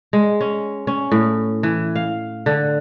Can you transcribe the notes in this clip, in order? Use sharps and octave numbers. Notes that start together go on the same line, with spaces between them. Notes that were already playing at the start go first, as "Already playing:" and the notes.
G#3
C#4
C#4
A2
E3
F5
D3